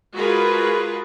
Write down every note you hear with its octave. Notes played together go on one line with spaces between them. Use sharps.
G#3 F4 F#4 G#4 A#4 B4